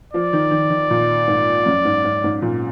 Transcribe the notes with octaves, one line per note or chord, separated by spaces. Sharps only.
F3 D5
D#3
D#3
D#3
A#2
G#2
F#2
G#2
G#2
G#2
A#2